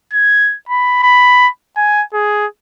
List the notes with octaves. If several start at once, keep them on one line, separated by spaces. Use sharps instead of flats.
G#6
B5
B5
G#5
G#4